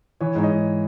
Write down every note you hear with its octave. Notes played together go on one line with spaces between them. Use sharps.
E3 C#5
G#2 C#5
D#5
G#2